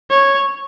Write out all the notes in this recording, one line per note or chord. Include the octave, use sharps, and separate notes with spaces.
C#5